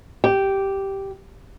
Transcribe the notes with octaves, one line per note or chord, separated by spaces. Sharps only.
G4